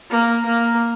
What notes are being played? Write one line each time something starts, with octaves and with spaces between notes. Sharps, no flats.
A#3
A#3